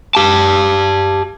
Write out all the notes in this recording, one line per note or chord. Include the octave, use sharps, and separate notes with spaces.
G4 A5